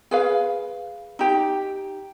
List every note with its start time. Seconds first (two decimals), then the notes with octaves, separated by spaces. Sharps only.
0.11 G#4 B4 F5
1.19 D#4 G4